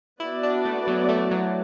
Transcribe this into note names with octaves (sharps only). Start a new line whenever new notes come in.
B3 E4 F#4 B4 D5
D4
A3
F#3
A3
F#3